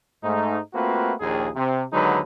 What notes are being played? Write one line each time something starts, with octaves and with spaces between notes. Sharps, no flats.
G#2 A3 D#4
A3 A#3 C4 F4 F#4 B4
A#1 D#2 G#4
C3
D#2 D3 F#3 G#3 D#4 B4